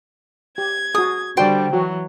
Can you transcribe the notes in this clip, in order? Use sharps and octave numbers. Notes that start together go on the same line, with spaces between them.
G4 G#6
F#4 G#4 D#6
D3 G3 F#4 C5 D5 G5
E3 F#3 F#4